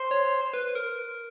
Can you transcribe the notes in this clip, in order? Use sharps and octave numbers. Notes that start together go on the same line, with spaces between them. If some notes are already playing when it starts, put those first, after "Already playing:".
Already playing: C5
C#5
B4
A#4